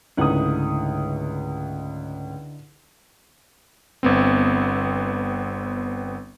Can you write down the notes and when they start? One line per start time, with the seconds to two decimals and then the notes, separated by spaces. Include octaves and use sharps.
0.17 C#2 G#2 D3 A3 D#4 E4 F#5 D#6
4.03 G1 B3 C4